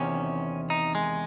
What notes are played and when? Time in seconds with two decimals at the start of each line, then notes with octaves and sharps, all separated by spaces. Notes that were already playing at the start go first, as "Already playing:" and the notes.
Already playing: E2 C3 D#3 C#4
0.70 D#4
0.95 G#3